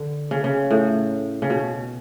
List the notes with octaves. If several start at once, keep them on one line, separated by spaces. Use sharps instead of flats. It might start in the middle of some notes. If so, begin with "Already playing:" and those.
Already playing: D3 D4
C#3
C#3
A2
C#3
B2